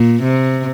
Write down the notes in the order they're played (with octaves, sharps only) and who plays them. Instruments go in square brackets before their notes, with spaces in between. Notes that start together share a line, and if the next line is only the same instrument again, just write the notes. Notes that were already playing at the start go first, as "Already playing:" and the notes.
Already playing: [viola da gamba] A#2
C3